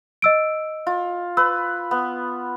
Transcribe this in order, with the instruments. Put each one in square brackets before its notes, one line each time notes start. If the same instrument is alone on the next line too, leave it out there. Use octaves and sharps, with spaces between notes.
[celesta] D#5 E6 D7
[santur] F4
[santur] B4 [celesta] E6
[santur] B3